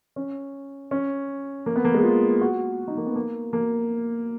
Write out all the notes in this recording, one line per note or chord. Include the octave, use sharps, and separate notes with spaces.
C#4
C#4
A#3
B3
A#3
G#3
F4
F#4
D#4
A#3
B3
A#3
A#3